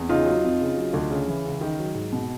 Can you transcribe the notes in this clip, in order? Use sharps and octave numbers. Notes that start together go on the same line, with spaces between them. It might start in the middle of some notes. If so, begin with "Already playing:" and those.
Already playing: E2
C#3 D#4 F4
F#3
F2
C#3
F#3
D2
C#3
E3
C#2
D#3
F#3
G#2
B2